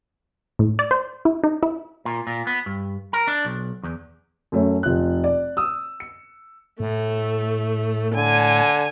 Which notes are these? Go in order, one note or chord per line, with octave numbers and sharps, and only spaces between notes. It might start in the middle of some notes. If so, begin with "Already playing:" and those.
A2
D5
C5
E4
D#4
E4
A#2
A#2
B3
G2
A#4
D4
B1
E2
F#2 A3 C#4
F1 F4 F#6
D5
D#6 E6
C#7
A2 A3
D3 G#5